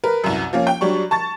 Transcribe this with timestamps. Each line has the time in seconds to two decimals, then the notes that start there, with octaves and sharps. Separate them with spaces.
0.04 A#4 B4
0.24 C2 F#2
0.53 F3 A#3 C#4
0.67 G5
0.81 F#3 G3 D4 C#6
1.11 A5 C#6 A6